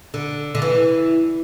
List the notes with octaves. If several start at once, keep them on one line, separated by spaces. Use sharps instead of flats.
D3
D3
E3